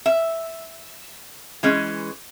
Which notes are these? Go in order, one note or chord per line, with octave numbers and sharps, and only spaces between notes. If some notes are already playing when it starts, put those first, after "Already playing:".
E5
E3 G#3 C#4